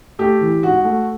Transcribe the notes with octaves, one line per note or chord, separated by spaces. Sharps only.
A3 G4
E3
G#2 F#4
A3